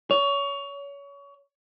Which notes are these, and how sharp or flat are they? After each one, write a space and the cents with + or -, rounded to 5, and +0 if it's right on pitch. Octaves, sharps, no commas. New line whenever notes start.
C#5 +25